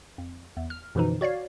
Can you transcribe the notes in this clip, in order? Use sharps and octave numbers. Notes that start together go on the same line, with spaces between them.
F2
E2
F6
F#2 B2 D3 E3 F3 D#4
F#4 C#5 D5 F5